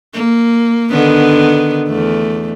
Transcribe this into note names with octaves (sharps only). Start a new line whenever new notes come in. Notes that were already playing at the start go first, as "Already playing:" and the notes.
A#3
D3 D#3 B3
E2 A3